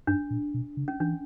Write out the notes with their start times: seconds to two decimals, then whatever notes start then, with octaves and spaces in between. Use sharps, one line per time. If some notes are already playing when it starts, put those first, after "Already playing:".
0.07 G2 D4
0.30 A#2
0.54 B2
0.77 C#3
0.88 C#4
1.00 E3 D4